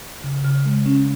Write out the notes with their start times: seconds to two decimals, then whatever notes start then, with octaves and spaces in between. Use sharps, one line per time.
0.24 C#3
0.45 C#3
0.65 G#3
0.86 C#4